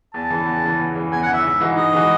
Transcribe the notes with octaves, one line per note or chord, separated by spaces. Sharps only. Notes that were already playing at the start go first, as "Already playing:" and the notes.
E2 A5
C#3 E3
E2
C#3 E3
E2
C#3 E3
E2 G#5
F#5
C#3 E3 E5
G#2
E3 G#3 D#4 F#4
G#2 D#5
E3 G#3 D#4 F#4